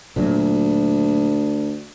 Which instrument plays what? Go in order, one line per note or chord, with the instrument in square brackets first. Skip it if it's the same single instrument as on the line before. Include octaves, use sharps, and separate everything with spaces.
[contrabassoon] D2 [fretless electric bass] A#2 F#3